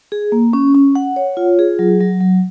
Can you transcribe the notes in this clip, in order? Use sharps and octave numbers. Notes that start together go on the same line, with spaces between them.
G#4
A#3
C#4
C#4
F#5
C#5
F4
G#4
F#3
F#3
F#3